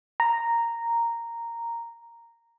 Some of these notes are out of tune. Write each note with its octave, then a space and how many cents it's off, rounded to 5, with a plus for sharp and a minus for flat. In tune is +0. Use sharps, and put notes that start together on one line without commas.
A#5 -5